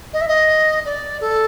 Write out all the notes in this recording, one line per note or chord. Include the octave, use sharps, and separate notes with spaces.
D#5
E5
D#5
D5
A4